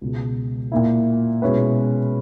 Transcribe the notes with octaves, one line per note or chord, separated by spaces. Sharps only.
C#2 B2 G#3
A#2 A#3 E4
B2 G#3 C#4 E4 B4